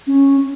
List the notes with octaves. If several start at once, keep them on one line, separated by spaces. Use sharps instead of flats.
C#4